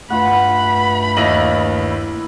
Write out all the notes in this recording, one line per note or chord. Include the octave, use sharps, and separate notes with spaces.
G2 A3 F4 F#5 B5
D#2 E4 A#4 B4 D#5 F#7